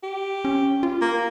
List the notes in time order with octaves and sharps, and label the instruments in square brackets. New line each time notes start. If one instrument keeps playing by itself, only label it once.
[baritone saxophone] G4
[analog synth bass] C#4
F4
[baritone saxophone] A#3